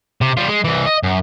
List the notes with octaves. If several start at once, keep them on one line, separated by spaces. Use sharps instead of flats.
C3
G3 F4
G#3
C2 E3
D#5
F#2